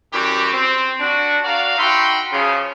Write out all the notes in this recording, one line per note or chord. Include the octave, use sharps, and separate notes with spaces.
F#2 E3 G3 F#4 G4
C4
D4 F#4
F#4 A#4 D5 F5
D#4 F#4 E5 G5 B5 C6
C#3 F3